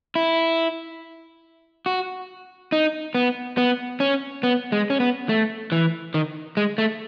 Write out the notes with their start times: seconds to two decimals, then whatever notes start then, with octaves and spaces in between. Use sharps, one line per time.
0.15 E4
1.86 F#4
2.72 D#4
3.15 B3
3.57 B3
4.00 C#4
4.43 B3
4.72 G#3
4.90 C#4
5.00 B3
5.29 A3
5.72 E3
6.14 D#3
6.57 G#3
6.78 A3